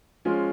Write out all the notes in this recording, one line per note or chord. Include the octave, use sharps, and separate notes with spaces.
F3 G#3 C#4 F4